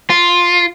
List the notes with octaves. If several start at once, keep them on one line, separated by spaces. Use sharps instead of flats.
F4